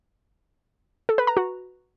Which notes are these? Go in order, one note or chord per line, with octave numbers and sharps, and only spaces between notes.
A4
B4
A#5
F#4